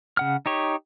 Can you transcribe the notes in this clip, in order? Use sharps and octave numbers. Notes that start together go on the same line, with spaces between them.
C#3 F#5 F6
D#4 G4 C#5